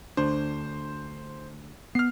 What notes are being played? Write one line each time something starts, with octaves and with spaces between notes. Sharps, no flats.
D2 D4 C5
B3 F6 C7